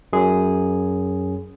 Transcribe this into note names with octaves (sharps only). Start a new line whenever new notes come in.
F#2 G#4